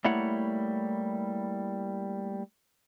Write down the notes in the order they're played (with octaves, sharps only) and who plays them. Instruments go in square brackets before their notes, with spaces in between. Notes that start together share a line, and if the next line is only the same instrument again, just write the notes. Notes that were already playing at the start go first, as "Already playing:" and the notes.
[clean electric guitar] G3 A3 A#3 E4 C#5 F#5